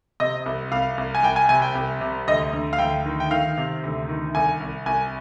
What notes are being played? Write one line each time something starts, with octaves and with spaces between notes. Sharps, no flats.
C3 D#5
C2
C2 F5
C2
G#5
C2 G5
G#5
C3 G#5
G5
C2
C3
D2 D#5
D2
F5
D2 G5
D#3
G5
D#3 F5
C3
D2
D#3
C2 G#5
C2
C2 G#5